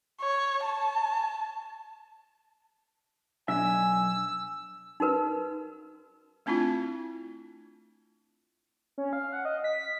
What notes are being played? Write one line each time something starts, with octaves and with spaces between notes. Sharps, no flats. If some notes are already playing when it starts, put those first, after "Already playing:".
C#5
A5
B1 D4 E5 G#5 E6
D#4 F#4 A#4 B4
A3 C4 D4 E4 F4
C#4
F5
F#5
D#5
B6